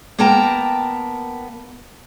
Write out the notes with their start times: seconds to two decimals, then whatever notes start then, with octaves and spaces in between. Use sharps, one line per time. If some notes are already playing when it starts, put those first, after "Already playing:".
0.18 A#3 B3 A#4 G5 A5 A#5